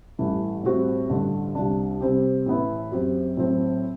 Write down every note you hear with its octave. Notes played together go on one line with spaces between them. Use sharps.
A1 G2 E3 A3
A2 G3 C4 F#4
A1 G2 D3
C2 C3 G3 D4
C3 G3 C4 G4
A2 E3 B3 E4
F#2 F#3 C4 G4
A2 F#3 C4